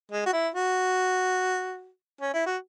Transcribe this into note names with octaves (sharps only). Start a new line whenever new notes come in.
G#3
F#4
E4
F#4
C#4
E4
F#4